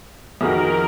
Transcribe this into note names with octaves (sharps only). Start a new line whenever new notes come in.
F2 D#3 F#4 G#4 A#4 E5